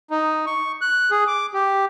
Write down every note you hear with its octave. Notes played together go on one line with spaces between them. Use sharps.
D#4
C#6
F#6
G#4
D6
G4